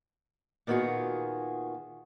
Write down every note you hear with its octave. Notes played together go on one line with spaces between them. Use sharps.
A#2 D#3 B3 F4 F#4 G#4